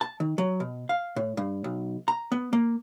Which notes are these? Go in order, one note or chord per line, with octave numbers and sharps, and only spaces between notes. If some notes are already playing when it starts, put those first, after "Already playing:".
A5
D#3
F#3
B2
F5
A2
G2
B1
A#5
B3
A#3